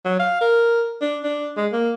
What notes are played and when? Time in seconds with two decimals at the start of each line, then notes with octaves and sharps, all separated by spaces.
0.05 F#3
0.19 F5
0.41 A#4
1.01 D4
1.23 D4
1.57 G#3
1.72 A#3